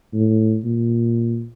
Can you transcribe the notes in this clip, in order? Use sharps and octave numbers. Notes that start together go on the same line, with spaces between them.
A2
A#2